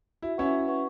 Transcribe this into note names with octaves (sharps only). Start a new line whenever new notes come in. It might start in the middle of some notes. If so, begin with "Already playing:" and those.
E4 F#4
C#4 E4 B4 F#5 C#6
F#4
B4 F#5 C#6